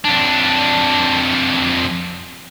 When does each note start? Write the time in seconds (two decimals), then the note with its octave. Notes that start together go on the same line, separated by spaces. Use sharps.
0.05 F2 D4